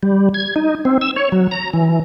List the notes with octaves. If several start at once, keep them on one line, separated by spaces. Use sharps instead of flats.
G3
G#6
D#4
C4
E6
C#5
F#3
A#5
E3